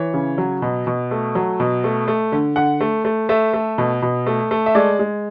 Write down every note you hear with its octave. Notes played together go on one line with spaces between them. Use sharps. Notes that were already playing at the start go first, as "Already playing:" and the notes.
Already playing: E3 C#5
C#3
F#3
B2
B2
A3
F#3
B2
A3
A3
D3
D3 F#5
A3
A3
A3 E5
A3
B2
B2
A3
A3
E5
G#3 D5
G#3